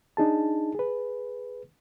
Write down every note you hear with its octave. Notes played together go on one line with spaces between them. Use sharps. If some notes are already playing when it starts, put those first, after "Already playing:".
D4 D#4 G#4 A5
G#4 B4